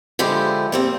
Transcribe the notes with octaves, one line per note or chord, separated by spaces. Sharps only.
D3 F3 G#3 E4 G4
G3 A#3 C4